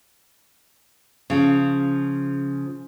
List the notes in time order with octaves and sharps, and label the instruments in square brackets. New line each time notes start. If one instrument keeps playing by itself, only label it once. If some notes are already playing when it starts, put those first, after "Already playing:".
[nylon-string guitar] C#3 F3